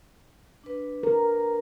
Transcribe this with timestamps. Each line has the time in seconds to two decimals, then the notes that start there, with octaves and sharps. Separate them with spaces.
0.64 D4 B4
1.03 A#4